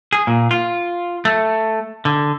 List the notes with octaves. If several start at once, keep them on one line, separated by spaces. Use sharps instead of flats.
G#4
A#2
F4
A3
D3